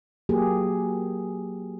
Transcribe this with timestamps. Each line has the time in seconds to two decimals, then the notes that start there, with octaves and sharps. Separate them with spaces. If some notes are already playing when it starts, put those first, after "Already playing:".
0.29 F#3 A#3 G4 G#4